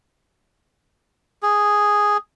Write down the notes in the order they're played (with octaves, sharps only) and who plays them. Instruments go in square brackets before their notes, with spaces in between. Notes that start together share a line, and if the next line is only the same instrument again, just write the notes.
[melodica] G#4